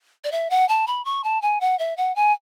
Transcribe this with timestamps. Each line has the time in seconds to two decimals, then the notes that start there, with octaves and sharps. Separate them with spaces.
0.24 D5
0.32 E5
0.50 F#5
0.69 A5
0.87 B5
1.05 C#6
1.24 A5
1.42 G#5
1.61 F#5
1.79 E5
1.97 F#5
2.16 G#5